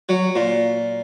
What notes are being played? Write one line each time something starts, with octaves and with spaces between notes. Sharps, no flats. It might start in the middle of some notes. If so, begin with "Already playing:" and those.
F#3
A#2